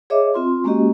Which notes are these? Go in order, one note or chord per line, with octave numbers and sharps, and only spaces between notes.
G#4 C#5 D#5 E5 D6
C4 F4 C6
G#3 A#3 C#4 F#4 G4 D#5